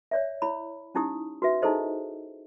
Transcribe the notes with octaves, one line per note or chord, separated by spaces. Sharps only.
C#5 D5 E5
E4 C#5 B5
C#4 D#4 E4 G4 D#6
F#4 B4 E5
D#4 E4 G#4 A4 C5 D#5